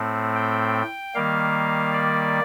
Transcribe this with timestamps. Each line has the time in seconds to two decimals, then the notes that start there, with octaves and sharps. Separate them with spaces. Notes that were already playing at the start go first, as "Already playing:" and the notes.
Already playing: A2 A3 C4
0.35 G5
1.15 D#3 G3 A#3 F5
1.93 D5